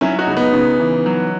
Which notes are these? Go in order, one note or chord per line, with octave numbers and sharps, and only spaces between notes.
F#3 C#4 E4
D#4 F#4
C#2
B3 D#4
C#3
E3
F#3